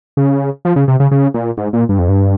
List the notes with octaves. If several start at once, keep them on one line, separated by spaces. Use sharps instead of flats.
C#3
F3
C#3
C3
C#3
C#3
A#2
G#2
A#2
G2
F2
G2